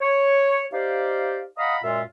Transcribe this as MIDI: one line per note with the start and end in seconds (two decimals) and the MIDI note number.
0.01 0.66 73
0.73 1.44 63
0.73 1.44 67
0.73 1.44 72
0.73 1.44 74
0.73 1.44 77
1.58 1.77 75
1.58 1.77 77
1.58 1.77 78
1.58 1.77 82
1.58 1.77 83
1.58 1.77 87
1.83 2.01 42
1.83 2.01 46
1.83 2.01 56
1.83 2.01 65
1.83 2.01 76